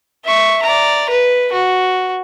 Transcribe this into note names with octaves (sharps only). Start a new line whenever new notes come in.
E5 C#6
D5 A#5
B4
F#4